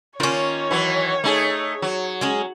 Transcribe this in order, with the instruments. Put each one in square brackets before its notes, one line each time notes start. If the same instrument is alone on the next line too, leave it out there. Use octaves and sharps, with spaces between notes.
[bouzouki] D#3 C#4 [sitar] A#3 F4 [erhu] C#5
[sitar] E3 F#3
A3 D#4 G#4
F#3
[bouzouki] G#3 C#4 G#4